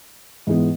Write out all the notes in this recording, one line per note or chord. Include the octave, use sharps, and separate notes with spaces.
G#2 E3 G#3 B3